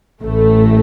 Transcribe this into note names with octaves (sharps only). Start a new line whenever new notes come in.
A1 A2 A3